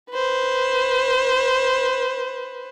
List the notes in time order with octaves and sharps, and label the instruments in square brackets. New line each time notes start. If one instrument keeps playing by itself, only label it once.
[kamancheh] B4 C5